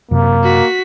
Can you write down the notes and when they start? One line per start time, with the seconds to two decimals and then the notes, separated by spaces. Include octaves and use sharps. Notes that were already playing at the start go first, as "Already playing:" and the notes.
0.11 F#2 C3 A#3
0.43 F#4 B6